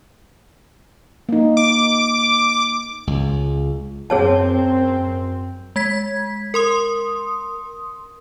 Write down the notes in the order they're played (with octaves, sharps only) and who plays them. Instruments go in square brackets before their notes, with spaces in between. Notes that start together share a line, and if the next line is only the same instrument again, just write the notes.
[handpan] A#3 D#4
[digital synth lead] D6
[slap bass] C#2
[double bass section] F#2 C4 [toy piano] G#4 C#5 A5
[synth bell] G#3 G#6 B6
A#4 C6 D#6